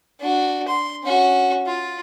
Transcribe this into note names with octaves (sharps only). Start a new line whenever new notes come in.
D4 F#4
C6
C#4 F#4
F4